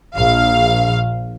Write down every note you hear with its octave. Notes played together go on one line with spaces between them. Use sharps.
A#1 F5